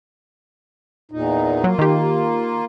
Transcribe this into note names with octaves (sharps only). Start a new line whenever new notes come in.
E2 A#2 D#4
F#3 A#3 F4
D#3 G4